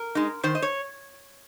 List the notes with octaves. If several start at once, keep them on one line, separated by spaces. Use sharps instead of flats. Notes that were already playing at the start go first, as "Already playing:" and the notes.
Already playing: A#4
G#3 D#4
D#3 C5
D#5
C#5